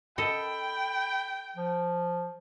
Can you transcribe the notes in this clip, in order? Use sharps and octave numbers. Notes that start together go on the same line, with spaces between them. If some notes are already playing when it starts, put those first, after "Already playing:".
A4 D#5 G5 B5
F3